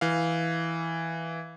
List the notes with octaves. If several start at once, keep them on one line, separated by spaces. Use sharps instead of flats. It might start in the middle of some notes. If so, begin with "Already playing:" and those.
E3 F5